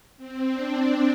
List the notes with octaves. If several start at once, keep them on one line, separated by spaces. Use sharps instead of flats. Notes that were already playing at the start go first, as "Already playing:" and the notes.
C4
D4